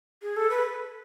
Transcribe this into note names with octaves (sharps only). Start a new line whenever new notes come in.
G#4
A4
B4